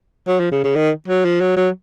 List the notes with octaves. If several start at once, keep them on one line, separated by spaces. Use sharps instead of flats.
F#3
F3
C#3
C#3
D#3
F#3
F3
F#3
F#3